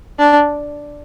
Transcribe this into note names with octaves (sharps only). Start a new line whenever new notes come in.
D4